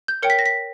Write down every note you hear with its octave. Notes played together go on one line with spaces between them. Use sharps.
G6
A#4 C#5 G5 C#7
B6
A#6
B6